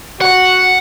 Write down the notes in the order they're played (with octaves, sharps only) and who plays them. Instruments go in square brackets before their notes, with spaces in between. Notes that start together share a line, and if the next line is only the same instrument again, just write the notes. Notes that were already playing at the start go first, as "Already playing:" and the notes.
[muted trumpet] F#4 [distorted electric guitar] F#5